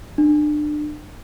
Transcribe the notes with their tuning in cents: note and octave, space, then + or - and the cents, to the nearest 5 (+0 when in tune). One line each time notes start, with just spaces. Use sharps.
D4 +30